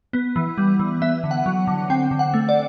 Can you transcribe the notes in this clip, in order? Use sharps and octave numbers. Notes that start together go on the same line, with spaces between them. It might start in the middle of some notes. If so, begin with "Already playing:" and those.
B3
E3
G3
E3
B3 E5
D3
F#5
F#3
D3
C4 G5
D3
F#5
A3
D5